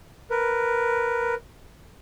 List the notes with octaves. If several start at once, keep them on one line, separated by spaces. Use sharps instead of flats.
A#4 B4